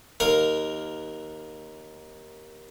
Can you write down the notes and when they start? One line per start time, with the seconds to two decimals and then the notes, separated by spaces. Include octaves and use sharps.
0.20 D#2 A#4 F5